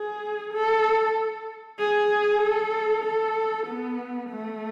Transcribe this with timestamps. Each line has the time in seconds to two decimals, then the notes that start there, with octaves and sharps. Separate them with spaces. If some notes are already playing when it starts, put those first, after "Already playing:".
Already playing: G#4
0.53 A4
1.79 G#4
2.41 A4
3.04 A4
3.67 B3
4.30 A3